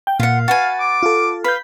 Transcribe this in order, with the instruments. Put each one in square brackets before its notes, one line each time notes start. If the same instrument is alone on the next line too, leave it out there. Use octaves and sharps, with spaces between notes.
[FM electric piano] G5
[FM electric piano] A#2 [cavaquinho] F4 F#5 [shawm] F5
[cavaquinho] F#4 B4 G#5 [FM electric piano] A6
[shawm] D6
[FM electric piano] F4 A4
[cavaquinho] B4 [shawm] F5 [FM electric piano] B5 G6